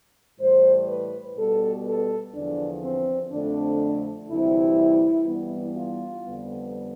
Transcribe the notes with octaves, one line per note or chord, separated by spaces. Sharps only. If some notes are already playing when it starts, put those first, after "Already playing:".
A2 E3 G3 C5
B4
B2 G3 B3 A4
A4
E2 D3 F3 D4
C4
F2 D3 A3 C4 D4
D2 C3 E3 G3 C4 E4
G2 E3 G3 B3
F4
F2 D3 G3 B3